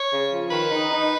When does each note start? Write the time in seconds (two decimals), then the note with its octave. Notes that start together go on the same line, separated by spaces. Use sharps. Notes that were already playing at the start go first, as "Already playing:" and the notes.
Already playing: C#5
0.10 C#3
0.31 F3
0.50 D#3 B4
0.70 D#4
0.90 D#4